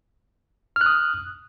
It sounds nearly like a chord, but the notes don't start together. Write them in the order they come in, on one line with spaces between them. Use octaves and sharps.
F6 F#6 D#6